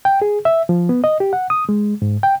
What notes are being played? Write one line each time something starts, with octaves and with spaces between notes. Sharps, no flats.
G5
G#4
E5
F3
B3
D#5
G4
F#5
D#6
G#3
G#2
G5